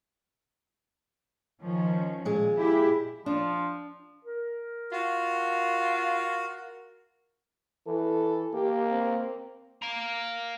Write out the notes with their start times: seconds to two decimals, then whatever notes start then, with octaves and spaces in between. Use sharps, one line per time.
1.62 D#3 F3 C#4
2.25 A#2 G#3 G#4
2.56 E4 G4 E5
3.26 F3 D4
4.25 A#4
4.92 F4 F#4
7.87 E3 A4
8.54 A#3 G4
8.91 C4
9.82 F5 A#5